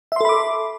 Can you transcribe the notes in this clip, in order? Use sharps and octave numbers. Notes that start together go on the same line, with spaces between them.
A4 E5 B5 C6 D6